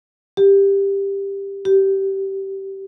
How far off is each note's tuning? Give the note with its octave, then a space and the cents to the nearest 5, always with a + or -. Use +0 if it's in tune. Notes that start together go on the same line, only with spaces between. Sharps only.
G4 +10
G4 -15